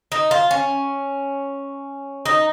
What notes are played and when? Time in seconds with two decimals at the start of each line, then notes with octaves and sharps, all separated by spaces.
0.12 D#4
0.31 F4
0.51 C#4
2.25 D#4